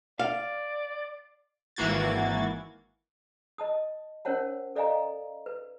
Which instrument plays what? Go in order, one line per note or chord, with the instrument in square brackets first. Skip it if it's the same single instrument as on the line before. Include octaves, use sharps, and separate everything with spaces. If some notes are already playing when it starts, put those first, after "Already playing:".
[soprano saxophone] D5 [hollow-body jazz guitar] F5
[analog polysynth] G#1 E3 A#3 F#4 G#6 A6
[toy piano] D#5 A5 D#6
C#4 A#4 C5 C#5 F#5 A5
A4 D5 D#5 F5 G#5 A#5
B4